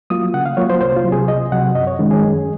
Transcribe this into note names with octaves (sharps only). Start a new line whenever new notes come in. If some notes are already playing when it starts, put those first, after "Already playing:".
F#3 A#3 F4 D#6
C#3 F#5
F5
F#3 A#3 F4 C#5
C5
C2 C5
F4
C3 F#3
G#4
C2 D#5
C3 F#3 F#5
F#2 D#5
C#5
D#3 G#3 C#4
G#4
F#2